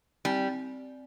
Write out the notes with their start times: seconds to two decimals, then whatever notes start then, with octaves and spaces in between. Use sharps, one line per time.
0.25 G3 C4